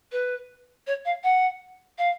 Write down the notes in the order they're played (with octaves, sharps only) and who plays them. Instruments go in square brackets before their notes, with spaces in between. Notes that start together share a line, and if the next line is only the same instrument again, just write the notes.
[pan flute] B4
C#5
F5
F#5
F5